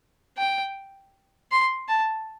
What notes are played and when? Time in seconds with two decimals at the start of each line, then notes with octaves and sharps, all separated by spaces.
0.38 G5
1.51 C6
1.88 A5